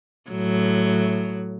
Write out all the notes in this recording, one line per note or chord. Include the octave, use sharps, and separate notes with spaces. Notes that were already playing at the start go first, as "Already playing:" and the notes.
A2 F#3